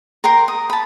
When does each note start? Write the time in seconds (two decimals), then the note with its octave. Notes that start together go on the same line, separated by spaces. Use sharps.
0.24 A#4 G5 A#5 C6
0.48 D#6
0.70 A5 B5